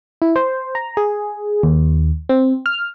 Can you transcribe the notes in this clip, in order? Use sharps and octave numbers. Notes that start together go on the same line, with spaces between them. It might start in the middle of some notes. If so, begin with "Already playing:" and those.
E4
C5
A#5
G#4
D#2
C4
F6